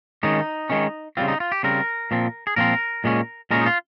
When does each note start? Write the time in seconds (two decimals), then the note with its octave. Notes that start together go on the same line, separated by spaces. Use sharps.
0.23 D#3 G#3 C#4 D#4
0.70 D#3 G#3 C#4
1.17 C#3 G3 C4 F4
1.28 D#4
1.40 F4
1.52 G4
1.63 C#3 G3 C4 A#4
2.11 A#2 F3 C4
2.47 G#4
2.56 A#2 F3 C4 A#4
3.04 A#2 G#3 C#4
3.51 A#2 G#3 C#4 A#4
3.61 D#4
3.66 F4